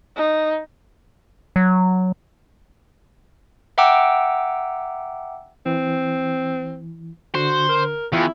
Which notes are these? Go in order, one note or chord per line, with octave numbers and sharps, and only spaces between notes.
D#4
F#3
E5 F#5 G5 A#5 D6 E6
E3 C4
D3 F#4 C5
A#4
E2 E4 F4 G5 G#5